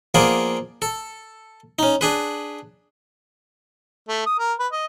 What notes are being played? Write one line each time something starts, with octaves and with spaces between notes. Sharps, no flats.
F3 A#3 B3 G#4 D5
A4
C#4 D#4
D4 G#4 B4
A3
D#6
A#4
B4
D#5